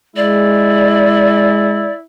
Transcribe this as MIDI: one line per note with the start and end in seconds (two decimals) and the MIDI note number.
0.16 1.88 56
0.16 2.03 64
0.16 1.93 74